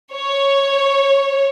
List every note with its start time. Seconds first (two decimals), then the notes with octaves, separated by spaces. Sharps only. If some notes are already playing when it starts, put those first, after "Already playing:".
0.14 C#5